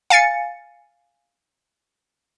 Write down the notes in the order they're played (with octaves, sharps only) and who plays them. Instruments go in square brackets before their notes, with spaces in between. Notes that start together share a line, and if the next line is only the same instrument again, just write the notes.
[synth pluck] F5 G#5 A6 C#7